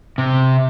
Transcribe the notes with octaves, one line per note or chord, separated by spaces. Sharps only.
C3